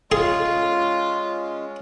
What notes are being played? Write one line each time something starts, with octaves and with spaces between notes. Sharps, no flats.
G#3 C#4 F4 G#4